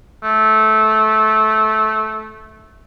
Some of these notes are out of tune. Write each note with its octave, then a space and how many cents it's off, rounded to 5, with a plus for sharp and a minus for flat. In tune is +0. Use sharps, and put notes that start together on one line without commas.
A3 -15